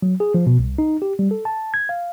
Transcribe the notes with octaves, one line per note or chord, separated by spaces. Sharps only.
F#3
G#4
F3
B2
C2
D#4
G4
G3
A4
A5
G#6
F5